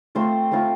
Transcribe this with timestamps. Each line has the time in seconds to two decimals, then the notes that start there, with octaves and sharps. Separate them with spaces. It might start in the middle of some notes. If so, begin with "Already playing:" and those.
0.15 A3 C4 F4 C5
0.51 A3 C4 F4